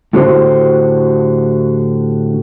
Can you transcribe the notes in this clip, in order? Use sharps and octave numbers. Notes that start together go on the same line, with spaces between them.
A2 D3 F#4 G4 B4 C5